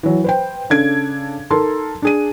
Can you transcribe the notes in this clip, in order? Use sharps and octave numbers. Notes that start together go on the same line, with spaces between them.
E3 F#3
B4 C5 G5
C#3 D4 A4 G#6 D7
D#4 A4 A#4 A5 C6
D4 G#4 D#7